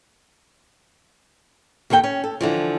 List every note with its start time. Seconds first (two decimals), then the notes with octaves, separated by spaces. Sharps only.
1.90 D#2 D#3 A4 C5 G5
2.04 C#4
2.24 A4
2.41 D3 E3 F3